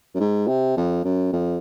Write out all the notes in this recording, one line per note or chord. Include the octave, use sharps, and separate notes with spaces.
F#2
G#2
C3
F2
F#2
F2